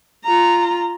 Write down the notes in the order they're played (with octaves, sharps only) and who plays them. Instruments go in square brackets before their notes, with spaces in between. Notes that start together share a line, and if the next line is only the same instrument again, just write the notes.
[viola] F4 A#5